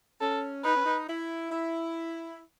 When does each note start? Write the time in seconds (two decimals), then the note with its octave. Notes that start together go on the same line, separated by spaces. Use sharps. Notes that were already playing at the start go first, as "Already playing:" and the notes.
0.21 C#4 A4
0.64 D#4 B4
0.75 C#4
0.85 D#4
1.08 E4
1.51 E4